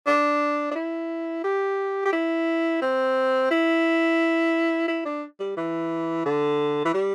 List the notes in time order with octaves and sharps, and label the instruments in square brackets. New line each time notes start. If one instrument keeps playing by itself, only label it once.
[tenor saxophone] D4
D4
E4
G4
G4
E4
C4
E4
E4
D4
G3
E3
D3
E3
G3